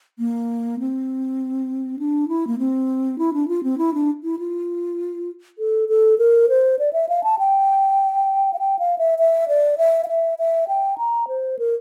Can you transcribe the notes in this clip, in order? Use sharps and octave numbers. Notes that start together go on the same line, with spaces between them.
A#3
C4
D4
E4
A#3
C4
E4
D4
F4
C4
E4
D4
E4
F4
A4
A4
A#4
C5
D5
E5
F5
A5
G5
F5
G5
F5
E5
E5
D5
E5
F5
E5
E5
G5
A#5
C5
A#4